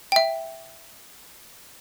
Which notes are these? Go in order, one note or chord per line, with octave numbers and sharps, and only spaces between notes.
E5 G5